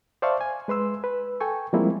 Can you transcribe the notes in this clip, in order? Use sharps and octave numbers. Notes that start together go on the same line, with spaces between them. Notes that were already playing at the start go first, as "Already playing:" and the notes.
C5 D5 E5 F5 A5 C#6
G#5
G#3 B4 C6 E6
B4
A4 G5 G#5 C#6
F3 G3 G#3 A#3 C4 E4